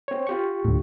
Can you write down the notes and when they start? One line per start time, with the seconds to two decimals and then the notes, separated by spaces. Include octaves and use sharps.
0.08 C4 C#5
0.27 F4 G4 C#6
0.64 D2 A2